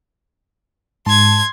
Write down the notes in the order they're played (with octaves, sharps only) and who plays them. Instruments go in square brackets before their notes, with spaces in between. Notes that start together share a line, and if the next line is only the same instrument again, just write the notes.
[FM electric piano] G#2 A5 [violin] C6 G#6